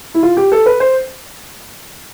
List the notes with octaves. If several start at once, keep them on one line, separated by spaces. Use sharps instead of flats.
E4
F4
G4
A4
B4
C5